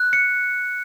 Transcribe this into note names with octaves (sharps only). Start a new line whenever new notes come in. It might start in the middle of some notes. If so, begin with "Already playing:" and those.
Already playing: F#6
C#7